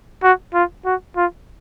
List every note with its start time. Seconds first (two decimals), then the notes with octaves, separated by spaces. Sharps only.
0.23 F#4
0.54 F4
0.85 F#4
1.16 F4